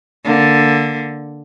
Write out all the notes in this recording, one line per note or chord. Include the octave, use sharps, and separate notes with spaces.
D3 A#3